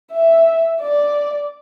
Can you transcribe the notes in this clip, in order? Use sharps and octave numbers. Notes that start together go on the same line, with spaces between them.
E5
D5